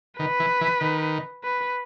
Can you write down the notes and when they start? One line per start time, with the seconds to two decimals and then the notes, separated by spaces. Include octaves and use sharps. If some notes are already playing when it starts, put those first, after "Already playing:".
0.19 D#3 B4
0.40 E3
0.61 E3
0.81 D#3
1.44 B4